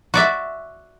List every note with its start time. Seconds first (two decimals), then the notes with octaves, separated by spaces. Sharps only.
0.14 F#4 D5 E5